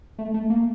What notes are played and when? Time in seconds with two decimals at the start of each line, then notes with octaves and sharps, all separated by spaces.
0.18 A3
0.34 A3
0.50 A#3